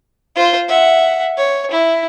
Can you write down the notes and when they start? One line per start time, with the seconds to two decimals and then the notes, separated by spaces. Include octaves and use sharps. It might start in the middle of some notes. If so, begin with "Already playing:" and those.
0.36 F4 C5
0.68 E5 F#5
1.38 C#5
1.71 E4